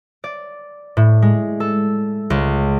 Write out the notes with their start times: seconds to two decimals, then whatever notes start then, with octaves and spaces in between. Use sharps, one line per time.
0.24 D5
0.97 A2
1.22 G#3
1.60 A4
2.30 C#2